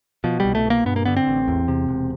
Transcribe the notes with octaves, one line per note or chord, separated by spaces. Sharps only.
B2 F3
C2 G3
A3
B2
A#3
G2 B3
A#3
D3 B3
C4
A1
E2
C3
E1